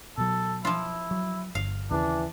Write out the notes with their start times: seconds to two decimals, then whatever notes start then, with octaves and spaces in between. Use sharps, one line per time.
0.18 B2 F#3 A4
0.65 F3 E4 F4
1.11 F#3
1.55 G1 F5
1.91 D#2 C#3 E3 D4